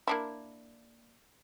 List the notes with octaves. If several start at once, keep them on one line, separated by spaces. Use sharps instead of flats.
A#3 D4 E4